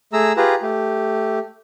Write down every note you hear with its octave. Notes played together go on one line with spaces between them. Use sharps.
A3 G#4 A#5 E6
F4 G4 G#4 B4 A#5
A3 G4